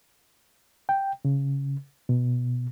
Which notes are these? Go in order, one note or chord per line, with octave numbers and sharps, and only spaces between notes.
G5
C#3
B2